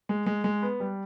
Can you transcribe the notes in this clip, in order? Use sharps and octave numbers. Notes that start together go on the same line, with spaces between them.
G#3
G#3
G#3
B3
G3